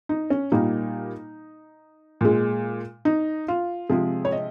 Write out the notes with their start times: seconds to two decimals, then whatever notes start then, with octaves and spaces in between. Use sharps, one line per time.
0.09 D#4
0.30 C#4
0.52 A#2 G3 A#3 D#4
2.21 A#2 G#3
3.05 D#4
3.48 F4
3.89 C3 F3 G#3 G#4
4.25 C#5
4.32 D#5